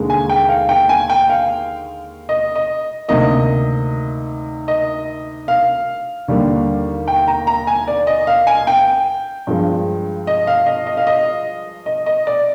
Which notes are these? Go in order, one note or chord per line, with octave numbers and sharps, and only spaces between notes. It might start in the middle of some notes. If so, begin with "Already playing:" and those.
Already playing: D#2 D3 G#3
G#5
G5
F5
G5
G#5
G5
F5
D#5
D#5
D2 C3 D#3 A#3 D#5
D#5
F5
D#2 D3 G3 A#3
G5
A#5
A#5
G#5
D5
D#5
F5
G#5
G5
G2 F3 G#3
D#5
F5
D#5
D#5
F5
D#5
D#5
D#5
D5